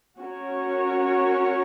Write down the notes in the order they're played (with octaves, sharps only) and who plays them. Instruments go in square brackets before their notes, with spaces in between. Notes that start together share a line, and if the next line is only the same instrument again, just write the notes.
[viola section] C#4 F#4 A#4 C#5